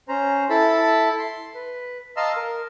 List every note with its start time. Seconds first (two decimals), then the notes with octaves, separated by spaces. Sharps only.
0.08 C#4 C5 A#5
0.50 E4 A4 A5 B5
1.19 C6
1.55 B4
2.16 D#5 F5 A5 A#5 C6 E6
2.36 A#4